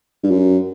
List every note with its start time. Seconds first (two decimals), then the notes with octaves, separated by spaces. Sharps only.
0.24 G2
0.31 F#2